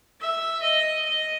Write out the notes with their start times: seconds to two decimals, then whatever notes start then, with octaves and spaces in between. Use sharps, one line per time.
0.21 E5
0.63 D#5
1.05 D#5